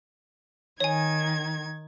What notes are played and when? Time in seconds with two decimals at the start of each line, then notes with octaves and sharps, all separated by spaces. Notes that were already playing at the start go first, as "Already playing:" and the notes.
0.80 D#3 C#5 G#5 G#6